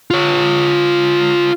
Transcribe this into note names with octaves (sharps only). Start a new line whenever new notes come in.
F4 C#5